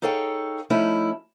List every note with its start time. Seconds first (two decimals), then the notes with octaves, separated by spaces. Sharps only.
0.02 D#4 G#4 A4 C#5 F5 G5
0.70 F3 A3 C#4 D#4 E4